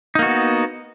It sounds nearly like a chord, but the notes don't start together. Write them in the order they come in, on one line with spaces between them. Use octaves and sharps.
D#4 A#3 F#4 B3